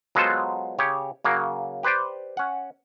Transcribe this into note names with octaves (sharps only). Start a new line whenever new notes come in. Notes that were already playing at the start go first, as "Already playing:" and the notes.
F#3 G#3 B3 F4 A4 C5
C#3 G4 C#5
C#3 F#3 A#3
G4 B4 C5 D5 G5
C#4 F#5